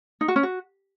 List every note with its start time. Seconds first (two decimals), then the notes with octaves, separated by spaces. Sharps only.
0.21 D#4
0.28 F#4
0.36 C#4
0.43 F#4